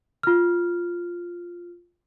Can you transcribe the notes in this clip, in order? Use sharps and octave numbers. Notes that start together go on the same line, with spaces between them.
F4 F6